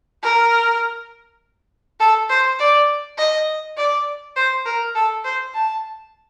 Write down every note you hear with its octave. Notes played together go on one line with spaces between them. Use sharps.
A#4
A4
C5
D5
D#5
D5
C5
A#4
A4
C5
A5